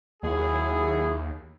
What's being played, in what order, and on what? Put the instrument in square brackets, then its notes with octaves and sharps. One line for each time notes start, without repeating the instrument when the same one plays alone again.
[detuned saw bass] D#2 [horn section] F#3 E4 G#4